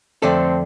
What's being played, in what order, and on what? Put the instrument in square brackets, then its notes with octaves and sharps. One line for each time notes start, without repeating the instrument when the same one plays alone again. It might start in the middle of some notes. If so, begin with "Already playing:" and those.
[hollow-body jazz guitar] F2 D3 A3 D4 A4 [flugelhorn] C4